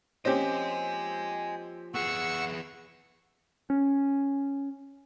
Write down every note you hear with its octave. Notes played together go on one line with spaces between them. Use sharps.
F3 A#3 C4 C#4 G4 D#5 G#5
B3 G#4 F#5 C#6 E6
C#4